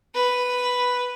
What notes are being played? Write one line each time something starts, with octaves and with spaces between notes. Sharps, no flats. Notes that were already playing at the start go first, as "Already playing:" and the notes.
B4